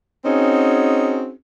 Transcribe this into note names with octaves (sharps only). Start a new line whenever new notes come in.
C4 C#4 D#4 F#4 G#4